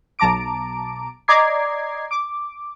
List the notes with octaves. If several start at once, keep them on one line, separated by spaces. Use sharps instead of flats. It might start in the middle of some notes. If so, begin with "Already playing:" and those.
B1 A5 A#5 D6 D7
D5 D#5 A#5 D6 G#6 C7
D6